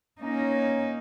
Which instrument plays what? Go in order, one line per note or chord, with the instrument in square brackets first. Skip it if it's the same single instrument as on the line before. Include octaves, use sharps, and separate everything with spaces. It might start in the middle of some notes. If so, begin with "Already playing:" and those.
[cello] A#3 D#4 [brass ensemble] C#4